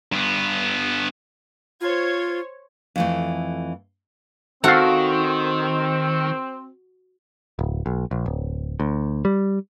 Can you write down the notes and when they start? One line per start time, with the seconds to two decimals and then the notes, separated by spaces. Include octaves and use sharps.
0.12 G2 B3
1.81 F4 C5 C#5 G#6
2.96 F2 E3 A3
4.64 D#3 C4 F#4 A4 F5
7.59 D1
7.86 B1
8.11 A#1
8.26 D1
8.80 D2
9.25 G3